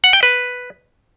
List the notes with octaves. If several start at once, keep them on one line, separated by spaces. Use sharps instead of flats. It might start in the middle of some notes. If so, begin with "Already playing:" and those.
F#5
G5
B4